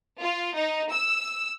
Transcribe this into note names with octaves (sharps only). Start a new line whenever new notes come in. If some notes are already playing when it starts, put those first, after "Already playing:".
F4
D#4
E6